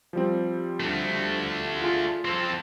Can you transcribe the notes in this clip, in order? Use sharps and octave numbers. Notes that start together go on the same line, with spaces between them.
F3 G3 C4
A3 D4
F4 G#4
C4 A4